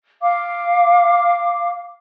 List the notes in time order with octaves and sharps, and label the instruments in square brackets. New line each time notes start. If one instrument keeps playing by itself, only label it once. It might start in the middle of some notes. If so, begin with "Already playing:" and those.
[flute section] F5 D6